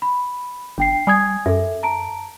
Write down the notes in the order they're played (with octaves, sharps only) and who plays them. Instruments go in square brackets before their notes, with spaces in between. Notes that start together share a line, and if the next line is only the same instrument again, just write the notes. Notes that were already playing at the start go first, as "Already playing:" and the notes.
[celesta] B5
[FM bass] G1 [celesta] D4 G5 C7
[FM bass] G3 [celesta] G#5 D#6 G#6
[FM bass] F#2 [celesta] A4 E5
[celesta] A5 A#5 D7